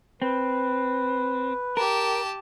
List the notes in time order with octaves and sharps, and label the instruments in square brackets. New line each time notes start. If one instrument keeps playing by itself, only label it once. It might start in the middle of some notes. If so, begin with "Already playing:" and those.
[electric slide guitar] C4 [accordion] B4
[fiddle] G4 A5 [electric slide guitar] A#4